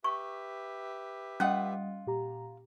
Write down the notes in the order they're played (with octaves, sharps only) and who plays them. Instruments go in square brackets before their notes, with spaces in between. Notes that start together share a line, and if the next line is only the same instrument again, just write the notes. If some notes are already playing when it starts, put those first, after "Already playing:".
[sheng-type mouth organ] G4 B4 E5 [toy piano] C#6
[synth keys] G3 D#5 [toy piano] C#4 [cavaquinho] F4 F#5 D#6
[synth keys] A#2 G4 A#5